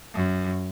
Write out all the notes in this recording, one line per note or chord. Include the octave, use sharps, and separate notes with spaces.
F#2